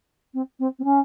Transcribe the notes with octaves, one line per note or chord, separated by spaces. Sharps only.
C4
C4
C4
C#4